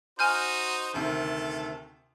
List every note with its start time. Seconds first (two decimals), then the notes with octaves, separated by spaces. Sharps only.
0.19 D#4 F#4 C5 G#5 F6 G6
0.94 D2 C3 D#3 A4